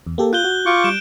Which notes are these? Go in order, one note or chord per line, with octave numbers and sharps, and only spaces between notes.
E2
A#3 G4 A4
F4 F#6 G6 G7
F#4
F4 C#6 D6
G3 D7 E7